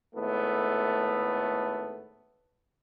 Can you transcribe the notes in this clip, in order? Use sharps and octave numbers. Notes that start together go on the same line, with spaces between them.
G#1 A2 A3 B3